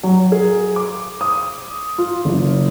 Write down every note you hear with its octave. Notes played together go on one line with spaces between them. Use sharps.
F#3
G#4
D6
D#6
F4
F#1